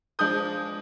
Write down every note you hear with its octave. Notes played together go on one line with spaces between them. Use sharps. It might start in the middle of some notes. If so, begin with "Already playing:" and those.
F3 G#3 D4 D#6 G6